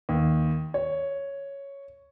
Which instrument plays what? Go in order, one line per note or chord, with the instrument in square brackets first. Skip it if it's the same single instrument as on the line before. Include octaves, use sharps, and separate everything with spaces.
[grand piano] D#2
C#5